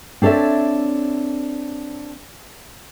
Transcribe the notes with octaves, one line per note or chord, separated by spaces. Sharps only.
C4 D4 A4 C#5 E5